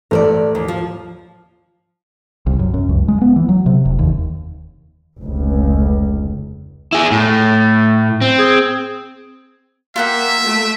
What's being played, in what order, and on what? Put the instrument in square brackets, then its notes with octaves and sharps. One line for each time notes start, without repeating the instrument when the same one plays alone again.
[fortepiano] A1 A3 [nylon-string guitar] A#4 C5 D5
[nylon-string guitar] D#2
F3
[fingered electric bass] C2
F#2
F#2
C#2
G#3
B3
E3
F#3
C3
F1
D#2
[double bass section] F1 C#2
[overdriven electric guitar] E4 G#4
[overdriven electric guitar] A2 [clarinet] A3
[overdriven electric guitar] C4
[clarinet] G#4
[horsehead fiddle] A#3 [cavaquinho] F4 F#5 G5 [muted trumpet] E5
[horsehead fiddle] A3